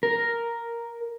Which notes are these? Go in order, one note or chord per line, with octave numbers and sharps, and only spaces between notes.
A#4